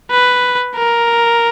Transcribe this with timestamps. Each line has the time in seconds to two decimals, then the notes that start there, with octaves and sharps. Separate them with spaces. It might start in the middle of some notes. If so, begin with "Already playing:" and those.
0.11 B4
0.76 A#4